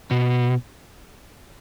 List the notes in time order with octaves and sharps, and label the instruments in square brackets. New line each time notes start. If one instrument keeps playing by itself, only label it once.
[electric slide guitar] B2